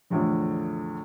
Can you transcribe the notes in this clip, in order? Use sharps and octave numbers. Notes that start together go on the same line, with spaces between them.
E2 A2 D3 F3